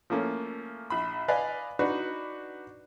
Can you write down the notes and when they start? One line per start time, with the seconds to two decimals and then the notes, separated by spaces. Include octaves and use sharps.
0.10 F3 A3 A#3 C#4
0.90 A#1 B5
1.28 B4 D5 D#5 F5 G#5
1.79 D4 D#4 F#4 B4